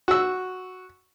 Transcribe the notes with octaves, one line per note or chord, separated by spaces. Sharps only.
F#4 E6